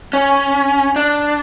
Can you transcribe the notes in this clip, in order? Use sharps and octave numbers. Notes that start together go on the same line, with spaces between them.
C#4
D4